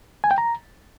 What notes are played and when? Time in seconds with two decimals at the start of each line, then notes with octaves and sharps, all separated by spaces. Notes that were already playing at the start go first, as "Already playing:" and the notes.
0.24 G#5
0.31 G5
0.38 A#5